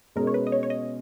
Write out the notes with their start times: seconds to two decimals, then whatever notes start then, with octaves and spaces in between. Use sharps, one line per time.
0.16 B2 G#3 C#4 G#4 A#4
0.27 C#5
0.34 B4
0.47 D#5
0.52 C#5
0.63 C#5
0.70 D#5